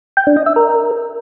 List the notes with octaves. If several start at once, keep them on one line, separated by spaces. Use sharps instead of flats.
G5
D4
D#5
E5
A#4